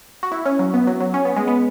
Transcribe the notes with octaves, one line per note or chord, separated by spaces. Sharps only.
F#4
E4
C#4
F#3
B3
F#3
F#3
C#4
B3
G#3
B3